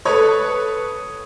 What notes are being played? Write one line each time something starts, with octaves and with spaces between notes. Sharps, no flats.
A4 B4 C#5 C#6 D#6 G#6